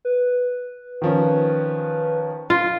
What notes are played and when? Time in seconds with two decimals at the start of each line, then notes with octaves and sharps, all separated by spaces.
0.05 B4
1.02 D#3 F3 C#4
2.50 F4